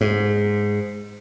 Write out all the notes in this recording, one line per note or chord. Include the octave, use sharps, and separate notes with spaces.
G#2